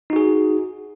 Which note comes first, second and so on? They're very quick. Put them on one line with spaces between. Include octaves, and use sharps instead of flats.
D#4 F#4 G#4